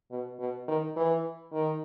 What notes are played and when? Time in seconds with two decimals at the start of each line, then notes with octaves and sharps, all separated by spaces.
0.11 B2
0.39 B2
0.68 D#3
0.96 E3
1.52 D#3